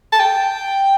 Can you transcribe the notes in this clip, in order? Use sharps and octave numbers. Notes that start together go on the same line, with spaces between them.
A5
G5